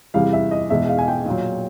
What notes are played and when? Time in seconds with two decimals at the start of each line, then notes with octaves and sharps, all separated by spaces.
0.14 E2 C3 E3 G3 F5
0.33 E5
0.51 D#5
0.70 E2 B2 G#3 E5
0.89 F5
0.98 G#5
1.08 G5
1.26 A#2 F#3